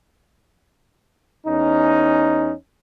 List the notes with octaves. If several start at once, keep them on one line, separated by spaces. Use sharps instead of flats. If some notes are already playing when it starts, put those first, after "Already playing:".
E2 C#4 D#4